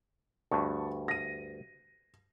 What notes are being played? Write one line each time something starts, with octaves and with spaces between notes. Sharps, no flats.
D2 G2 A5 C#6
A#6 D#7